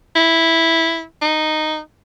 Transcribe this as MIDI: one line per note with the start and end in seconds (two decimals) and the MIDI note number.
0.15 1.03 64
1.21 1.79 63